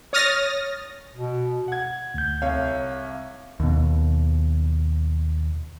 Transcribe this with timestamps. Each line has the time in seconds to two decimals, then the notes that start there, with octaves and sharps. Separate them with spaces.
0.13 C#5 D#6 F6 A6 A#6
1.15 B2
1.68 F#5 G#6
2.14 D2 G6
2.42 C2 C#5 F5
3.60 D#2 B2